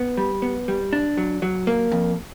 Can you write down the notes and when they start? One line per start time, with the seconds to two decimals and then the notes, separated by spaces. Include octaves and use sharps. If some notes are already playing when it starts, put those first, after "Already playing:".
Already playing: B3
0.17 G3
0.42 B3
0.68 G3
0.93 D4
1.18 F#3
1.42 F#3
1.67 A#3
1.91 F2